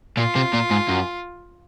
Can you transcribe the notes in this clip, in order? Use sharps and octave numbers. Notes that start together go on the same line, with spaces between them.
A#2 F4
C3
A#2
G#2
F#2